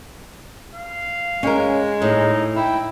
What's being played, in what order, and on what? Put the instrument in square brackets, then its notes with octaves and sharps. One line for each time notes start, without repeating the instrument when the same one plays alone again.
[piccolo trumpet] F5
[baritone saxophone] G#3 [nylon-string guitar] C#4 A#4
[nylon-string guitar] A2 [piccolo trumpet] D#4
[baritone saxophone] E4 [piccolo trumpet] G5